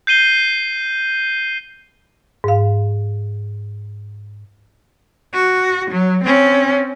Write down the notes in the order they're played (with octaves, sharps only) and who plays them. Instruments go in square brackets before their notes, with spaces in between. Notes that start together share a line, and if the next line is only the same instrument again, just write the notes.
[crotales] G6 C7 D#7 G7
[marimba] G#2 F5
[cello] F#4
F#3
C4 C#4